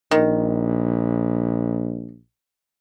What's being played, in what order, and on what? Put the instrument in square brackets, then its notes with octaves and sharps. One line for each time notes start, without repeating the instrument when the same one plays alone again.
[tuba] A#1 [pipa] D#3